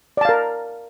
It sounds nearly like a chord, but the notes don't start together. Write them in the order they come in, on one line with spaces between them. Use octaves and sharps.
D5 A5 F5 A#4